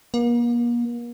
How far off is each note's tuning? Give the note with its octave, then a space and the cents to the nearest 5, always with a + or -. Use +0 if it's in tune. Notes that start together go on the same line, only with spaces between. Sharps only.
A#3 +40